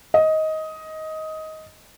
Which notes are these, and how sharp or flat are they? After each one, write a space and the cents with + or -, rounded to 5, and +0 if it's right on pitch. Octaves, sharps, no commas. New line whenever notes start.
D#5 +15